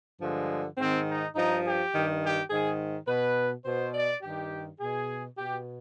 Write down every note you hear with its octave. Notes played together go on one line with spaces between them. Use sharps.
G2 D3 F3 G#3
G#2 D#3 C4
D#4
G2 F3 D#4
G4
G2 D#3
G4
G#2 D#3 G#4
B2 B4
B2 C5
D5
G2 D#3 G4
B2 G#4
B2 G4